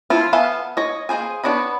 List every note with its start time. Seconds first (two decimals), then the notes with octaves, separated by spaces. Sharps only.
0.10 F3 E4 F4
0.33 B3 A4 E5 F5 G#5
0.77 C#5 D#5
1.09 A#3 G#4 C5 G#5
1.44 B3 D4 C#5 D#5 B5